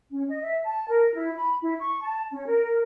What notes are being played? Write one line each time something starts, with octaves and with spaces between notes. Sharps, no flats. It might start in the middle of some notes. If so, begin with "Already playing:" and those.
C#4
D#5
E5
A5
A#4
E4
B5
E4
C#6
A5
C#4
A#4